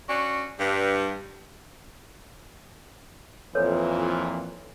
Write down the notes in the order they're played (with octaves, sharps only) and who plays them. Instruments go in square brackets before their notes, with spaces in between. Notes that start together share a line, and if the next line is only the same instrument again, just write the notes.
[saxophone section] C#4 D4 F#4
G2
[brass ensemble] F2 A#2 E3 [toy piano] A4 B4 C#5